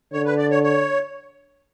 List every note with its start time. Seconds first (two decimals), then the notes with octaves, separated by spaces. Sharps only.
0.13 D3 C#5
0.25 B4
0.38 D5
0.50 C#5
0.63 C#5